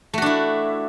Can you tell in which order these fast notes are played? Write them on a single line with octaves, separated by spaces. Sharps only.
A3 F#4 D4 E4